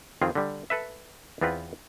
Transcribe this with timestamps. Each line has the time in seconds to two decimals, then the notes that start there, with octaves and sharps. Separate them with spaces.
0.22 F2 D#3 C4 F4 G#4
0.35 D3 G3
0.70 A4 B4 E5
1.41 E2 B3 C4 F4 B4